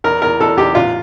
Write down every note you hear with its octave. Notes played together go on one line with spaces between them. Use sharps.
E2 A#4
E2 A#4
E2 A4
E2 G4
A1 F4